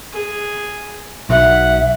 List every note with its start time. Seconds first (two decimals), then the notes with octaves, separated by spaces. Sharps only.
0.12 G#4
1.29 B1 E5 F#5